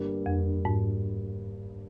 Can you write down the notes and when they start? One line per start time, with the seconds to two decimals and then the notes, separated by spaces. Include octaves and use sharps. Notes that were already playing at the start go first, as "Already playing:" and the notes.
Already playing: G1 G2 G3 A#3
0.26 F2
0.65 G#2